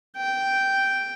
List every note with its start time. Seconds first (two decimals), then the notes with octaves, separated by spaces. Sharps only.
0.17 G5